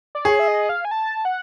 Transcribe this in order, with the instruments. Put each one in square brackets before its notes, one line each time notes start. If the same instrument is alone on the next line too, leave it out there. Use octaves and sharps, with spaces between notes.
[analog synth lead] D5
[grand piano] G#4 [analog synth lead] C#5
[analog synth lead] E5
D#5
F5
G#5
A5
F#5